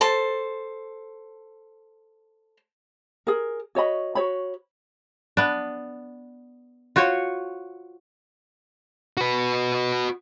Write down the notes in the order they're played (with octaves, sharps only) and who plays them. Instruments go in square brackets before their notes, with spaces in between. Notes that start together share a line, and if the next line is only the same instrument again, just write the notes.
[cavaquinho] A4 C5 A5
[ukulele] G#4 A#4
F#4 C#5 D#5 B5
F#4 C#5 B5
[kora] B3 D4
F4 F#4 C5 C#5
[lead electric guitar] F#4 B4